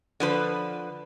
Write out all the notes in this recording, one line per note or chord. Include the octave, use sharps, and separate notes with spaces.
D3 F3 B4